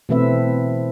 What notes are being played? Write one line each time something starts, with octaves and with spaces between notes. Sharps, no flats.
B2 E3 A3 C4 B4 E5